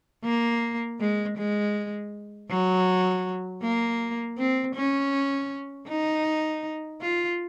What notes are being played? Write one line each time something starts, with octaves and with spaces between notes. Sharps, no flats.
A#3
G#3
G#3
F#3
A#3
C4
C#4
D#4
F4